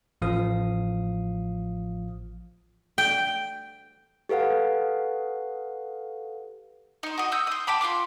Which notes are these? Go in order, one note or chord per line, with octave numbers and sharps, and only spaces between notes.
A1 F3 F5 D#6
G5
G4 A4 B4 F5 F#5
D#4 C5
F#4 D#5
D#6 E6 G6
C6 D#6
G5 A5 B5 D6
F4 F#4 C6 D6